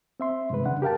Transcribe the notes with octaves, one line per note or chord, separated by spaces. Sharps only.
C4 E5 C6
G2 C3 D#3 G#3 B4
F2 C#3 D4 F#5
G4 A#4 F5 G5 A5